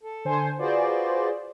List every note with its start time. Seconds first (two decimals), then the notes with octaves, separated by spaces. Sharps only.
0.03 A4
0.25 D3 C5 G#5
0.59 F4 F#4 G#4 B4 C5 D5